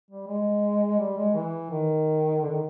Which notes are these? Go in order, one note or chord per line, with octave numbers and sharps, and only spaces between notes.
G3
G#3
G3
G#3
E3
D#3
D3
D#3